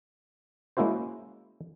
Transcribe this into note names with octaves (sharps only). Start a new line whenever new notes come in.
G#3 A#3 C#4 E4 F#4 C5